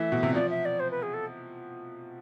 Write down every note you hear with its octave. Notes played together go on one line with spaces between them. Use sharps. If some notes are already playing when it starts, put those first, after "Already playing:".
Already playing: E3 A3 E5
B2
C3
F3 D5
E5
D5
C5
B4
G#4
A4